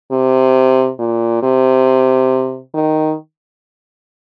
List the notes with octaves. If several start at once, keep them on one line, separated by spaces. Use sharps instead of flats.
C3
A#2
C3
D#3